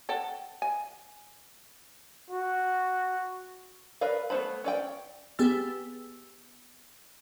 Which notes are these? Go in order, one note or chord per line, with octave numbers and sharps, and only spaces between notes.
A4 F#5 G5
G#5
F#4
A#4 B4 D5 F5
A3 B3 D4 C5 B5
C#4 D5 G5
B3 G4 G#4 E6 A6